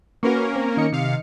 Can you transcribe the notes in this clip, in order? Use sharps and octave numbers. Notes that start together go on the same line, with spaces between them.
A#3 C#4 F#4 A#4 B4 C#6
C4
D#3 D#5 C#7
C3 F5